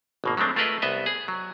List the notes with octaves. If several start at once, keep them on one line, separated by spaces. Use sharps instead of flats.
G#1 B2 A#3
F#3 G#3 A3 C4 D4
A3 F4 G#4 A#4 B4 D#5
C2 B3 D#5 E5
G#4
F#3